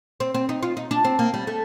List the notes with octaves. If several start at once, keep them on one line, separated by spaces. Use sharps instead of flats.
C4
C4
D#4
F4
D#4
D4
C4
A#3
G3
A3